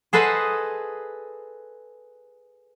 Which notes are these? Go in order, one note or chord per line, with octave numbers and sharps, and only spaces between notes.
G#4 A4 B4 C5 D#5 F#5